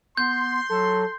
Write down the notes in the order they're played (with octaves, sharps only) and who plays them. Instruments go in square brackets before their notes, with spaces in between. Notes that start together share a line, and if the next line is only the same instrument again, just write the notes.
[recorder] B3 [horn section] C6 [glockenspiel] G6
[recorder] F#3 [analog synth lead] A4